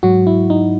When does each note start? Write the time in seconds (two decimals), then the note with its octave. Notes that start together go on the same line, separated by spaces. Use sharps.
0.03 G#2 F#3 F#4
0.27 E4
0.50 D#4